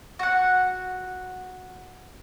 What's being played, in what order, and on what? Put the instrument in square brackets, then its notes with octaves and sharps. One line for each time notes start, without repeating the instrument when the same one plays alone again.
[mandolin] F#4 F#5